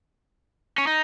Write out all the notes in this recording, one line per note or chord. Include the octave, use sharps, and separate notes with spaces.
C#4
D#4